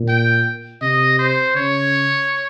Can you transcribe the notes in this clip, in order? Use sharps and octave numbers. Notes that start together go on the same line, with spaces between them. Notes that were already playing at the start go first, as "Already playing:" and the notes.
Already playing: A#2
G5
C3 D#5
C5
C#3 C#5